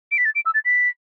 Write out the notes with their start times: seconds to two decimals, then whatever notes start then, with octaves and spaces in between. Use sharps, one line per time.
0.12 D7
0.18 B6
0.25 A6
0.35 D7
0.46 E6
0.54 A6
0.65 B6